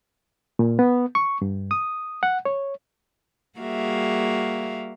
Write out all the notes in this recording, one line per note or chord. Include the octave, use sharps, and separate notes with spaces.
A#2
B3
C#6
G2
D#6
F#5
C#5
G3 A#3 F#4 G#4 E5 F5